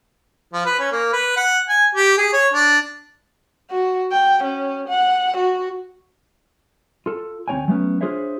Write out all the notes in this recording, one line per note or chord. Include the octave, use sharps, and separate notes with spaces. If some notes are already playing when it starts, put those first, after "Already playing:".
F3
B4
C#4
A#3
B4
F#5
G#5
G4
G#4
C#5
D4
F#4
G5
C#4
F#5
F#4
F4 A4
D2 C4 D#4 C#5 G5 G#5
F#3 A3 B3 C#4
D4 F4 G#4 C5 C#5 E5